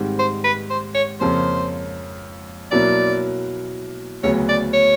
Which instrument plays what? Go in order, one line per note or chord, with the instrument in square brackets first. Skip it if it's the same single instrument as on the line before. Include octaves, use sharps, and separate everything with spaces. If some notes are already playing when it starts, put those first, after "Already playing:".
Already playing: [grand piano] G#2 D#3 G3 C4
[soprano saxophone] C5
B4
C5
C#5
[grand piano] F2 C#3 F3 A#3 C#4 [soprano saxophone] C5
[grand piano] B2 F#3 A#3 C#4 E4 [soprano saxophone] D5
[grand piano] D2 C#3 F#3 B3 [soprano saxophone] C#5
[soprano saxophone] D5
C#5